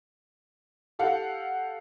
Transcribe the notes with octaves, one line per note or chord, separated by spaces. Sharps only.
G4 A4 F5 F#5